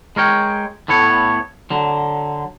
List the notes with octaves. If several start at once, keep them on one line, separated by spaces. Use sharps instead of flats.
G#3 A#4 C#5 G5
A2 A3 B3 C#5
D3 F#3